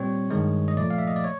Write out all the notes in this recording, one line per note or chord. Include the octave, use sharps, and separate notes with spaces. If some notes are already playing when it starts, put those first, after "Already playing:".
Already playing: A#2 G3 C4 C#5
G2 D#3 G#3
D#5
A#2 F3 A3 D5
F5
E5
D#5
D5
C#5